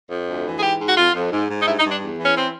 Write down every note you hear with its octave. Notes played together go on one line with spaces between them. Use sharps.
F2
D2
E3
G#4
G#2 G4
G#2
F#4
F2 F4
F2
G#2
G#2
D#4
G2 E4
D#4
G2
D4
E2
E3
C#4
C4